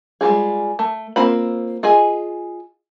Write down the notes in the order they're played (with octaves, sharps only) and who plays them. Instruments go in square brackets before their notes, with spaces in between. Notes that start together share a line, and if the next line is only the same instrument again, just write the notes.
[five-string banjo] G3 G#3 A#3 F4 G#4
A3
A#3 C4 F4 B5
F4 G#4 D#5 G#5